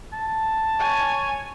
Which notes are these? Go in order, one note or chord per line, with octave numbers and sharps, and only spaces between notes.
A5
C#5 G#5